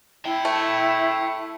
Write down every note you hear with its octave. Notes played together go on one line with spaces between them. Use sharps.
E4 E5 G5
A3